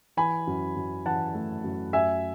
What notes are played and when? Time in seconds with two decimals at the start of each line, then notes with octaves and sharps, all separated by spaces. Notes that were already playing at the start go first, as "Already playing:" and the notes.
0.17 E3 G#5 B5
0.47 F#2
0.76 F#2
1.05 E3 F#5 A5
1.34 A3
1.64 F#2
1.93 F#2 E5 G#5